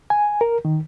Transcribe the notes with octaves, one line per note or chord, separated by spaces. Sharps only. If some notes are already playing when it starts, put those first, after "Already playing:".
G#5
A#4
D#3